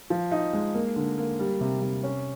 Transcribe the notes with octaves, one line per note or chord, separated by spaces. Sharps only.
F3
D#4
G#3
A#3
D3
A#3
G3
C3
C3
C#4